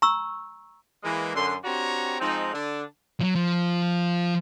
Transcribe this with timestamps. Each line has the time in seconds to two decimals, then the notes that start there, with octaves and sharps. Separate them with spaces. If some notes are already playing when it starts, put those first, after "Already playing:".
0.02 A#5 C#6 E6
1.03 E3 G#3 A#3
1.35 F#2 D3 C6
1.64 C4 D4 F#4 G4 C#5 A#5
2.20 F3 G#3 C4 D#4
2.53 D3 D4
3.21 F3 F#3
3.35 F3